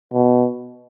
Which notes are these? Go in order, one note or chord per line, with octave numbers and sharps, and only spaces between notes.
B2